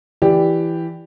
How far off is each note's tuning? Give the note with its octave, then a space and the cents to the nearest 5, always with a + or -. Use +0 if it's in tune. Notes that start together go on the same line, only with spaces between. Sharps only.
E3 +10 G4 +0 D5 +0